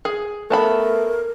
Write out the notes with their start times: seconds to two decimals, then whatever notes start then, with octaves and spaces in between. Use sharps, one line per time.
0.05 G#4
0.50 A3 B3 A#4 A5 B5